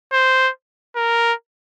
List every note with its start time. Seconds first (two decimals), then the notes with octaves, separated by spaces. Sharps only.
0.13 C5
0.96 A#4